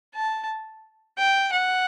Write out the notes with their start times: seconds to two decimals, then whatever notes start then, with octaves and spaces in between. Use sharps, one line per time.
0.15 A5
1.18 G5
1.52 F#5